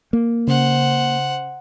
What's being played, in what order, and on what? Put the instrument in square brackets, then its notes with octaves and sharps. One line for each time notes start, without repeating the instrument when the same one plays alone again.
[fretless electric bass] A#3
[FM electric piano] C#3 [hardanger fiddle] C5 F#5